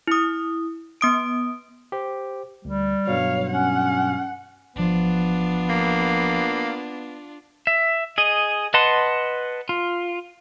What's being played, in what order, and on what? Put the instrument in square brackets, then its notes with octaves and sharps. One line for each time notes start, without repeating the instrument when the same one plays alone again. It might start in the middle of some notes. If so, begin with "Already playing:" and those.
[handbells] E4 D#6
B3 D#6 D7
[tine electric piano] G4 C5
[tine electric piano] D2 [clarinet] G3
[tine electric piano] G2 B2 F#3 [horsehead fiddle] C#5 F5
[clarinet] C#4 [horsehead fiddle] F#5
[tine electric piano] G#1 F3 [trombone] B3 [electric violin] D4 F4
[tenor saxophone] A#3
[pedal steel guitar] E5
G#4 D#5
B4 D#5 F#5 A5 C6
F4